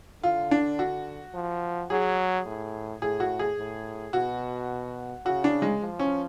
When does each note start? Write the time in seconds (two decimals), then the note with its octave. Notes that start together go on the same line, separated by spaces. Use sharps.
0.23 D3 F4
0.51 D4
0.79 F#4
1.34 F3
1.90 F#3 G#4
2.46 A2
3.02 A2 G#4
3.20 F#4
3.39 G#4
3.58 A2
4.13 B2 F#4
5.25 C#3 F#4
5.44 D4
5.62 G#3
5.81 F3
5.99 C#4